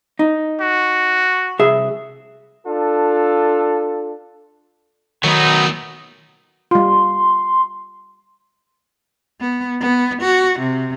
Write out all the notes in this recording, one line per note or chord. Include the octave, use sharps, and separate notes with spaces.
D#4
F#4
C2 G#4 E5
D4 F4 A4
E2 D#3 F#3 A3 B3 D#4
G3 F4 C6
B3
B3
F#4
C3